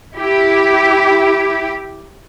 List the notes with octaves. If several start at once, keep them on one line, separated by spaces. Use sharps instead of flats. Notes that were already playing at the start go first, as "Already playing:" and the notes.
E4 G4